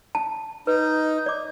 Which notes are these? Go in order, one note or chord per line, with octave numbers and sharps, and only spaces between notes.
A5
D#4 B4
D5 D6